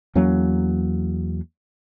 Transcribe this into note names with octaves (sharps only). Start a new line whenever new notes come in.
E2 F#3 A#3 C#4